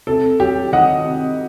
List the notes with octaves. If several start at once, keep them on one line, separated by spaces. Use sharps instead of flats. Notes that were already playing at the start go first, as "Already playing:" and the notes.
C3 A4
F#3 G4
D#3 D#5 F#5
C3